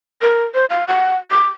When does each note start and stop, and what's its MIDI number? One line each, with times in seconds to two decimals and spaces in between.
0.22 0.44 70
0.54 0.66 72
0.70 0.84 77
0.88 1.16 78
1.31 1.47 86